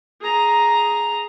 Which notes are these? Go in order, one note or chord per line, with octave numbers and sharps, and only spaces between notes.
G#4 A#5